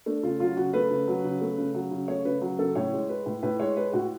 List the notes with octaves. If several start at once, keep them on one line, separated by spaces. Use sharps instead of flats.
A3 D4
C#3 F4
F#3 F4
C#3 F#4
A3 B4
C#3
F#3
C#3
A3
C#3
F#3
C#3
A3 C#5
C#3 B4
F#3
C#3 A4
A2 C#5
G#3
G#3 B4
A2
A2 B4
G#3 C#5
G#3 B4
A2 F#4